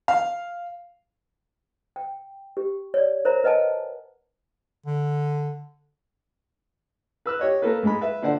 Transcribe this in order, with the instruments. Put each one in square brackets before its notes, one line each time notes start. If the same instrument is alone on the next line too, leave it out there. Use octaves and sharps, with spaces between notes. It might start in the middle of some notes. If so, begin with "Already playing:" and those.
[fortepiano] F5
[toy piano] G5
G4
C#5 D5
A#4 C5 C#5 E5 A#5
B4 D#5 F#5 G#5 A5
[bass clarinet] D3
[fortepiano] B4 E6 F#6
G4 C#5 D#5
A#3 A4 B4
G#2 G#3 B5
B4 E5
A#2 D3 C5 D5 F#5